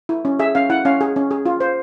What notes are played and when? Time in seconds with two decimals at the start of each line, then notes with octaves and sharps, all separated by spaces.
0.09 E4
0.25 C#4
0.39 G#4 E5
0.55 C#4 F5
0.70 E4 F#5
0.85 C#4 F5
1.01 G#4
1.16 C#4
1.31 G#4
1.46 F4
1.60 C5